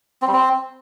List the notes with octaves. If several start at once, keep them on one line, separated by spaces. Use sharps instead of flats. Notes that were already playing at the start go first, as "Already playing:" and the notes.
C4
G3
C4